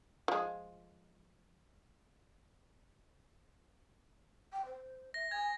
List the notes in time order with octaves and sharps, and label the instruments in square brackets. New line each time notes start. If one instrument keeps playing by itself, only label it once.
[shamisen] F3 G#3
[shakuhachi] G5
C5
[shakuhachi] E5 [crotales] A#6
[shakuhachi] G#5 [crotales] G#6